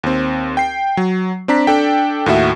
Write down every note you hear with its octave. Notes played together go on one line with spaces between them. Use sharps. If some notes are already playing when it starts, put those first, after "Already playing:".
D#2 C4
G5 C7
F#3
C4 D4 A#5 B6
D4 A4 G5
D#2 A2 F#4 E5